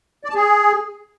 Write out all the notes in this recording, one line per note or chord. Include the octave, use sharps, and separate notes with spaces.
D5
A5
G#4